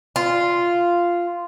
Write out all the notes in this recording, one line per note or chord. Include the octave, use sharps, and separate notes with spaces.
F4